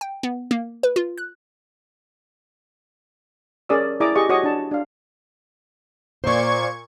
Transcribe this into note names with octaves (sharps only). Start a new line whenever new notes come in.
G5
B3
A#3
B4
F4
F#6
C#4 G#4 A#4 D5 D#6 E6
E4 G#4 D5 A#5 D6 D#6
G4 G#4 D#5 C#6
F#4 C#5 D#5 C#6 D#6
D4 A5
D4 F5
A#2 C5 D5 C#6 G#6